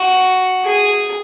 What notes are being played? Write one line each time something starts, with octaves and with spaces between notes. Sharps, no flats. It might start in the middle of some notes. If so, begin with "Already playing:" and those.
Already playing: F#4
G#4